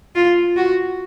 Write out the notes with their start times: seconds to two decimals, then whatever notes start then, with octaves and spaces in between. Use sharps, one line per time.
0.15 F4
0.56 F#4